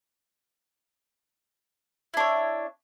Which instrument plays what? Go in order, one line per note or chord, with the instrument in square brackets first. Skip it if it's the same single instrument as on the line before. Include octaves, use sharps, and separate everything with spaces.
[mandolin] E4
D4
C#5